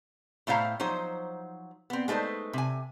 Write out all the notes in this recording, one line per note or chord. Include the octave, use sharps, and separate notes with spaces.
A2 A3 E4 C5 F5 A#5
F3 F#3 D#4 C5
B3 C4
G#3 A3 D#4 B4 C5
C3 G#5